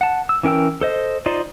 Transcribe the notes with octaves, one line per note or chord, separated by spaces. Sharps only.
F#5 A5
E6
E3 C#4 A#4 G5 E6
A4 C5 D#5
D#4 F4 C5 D5 C6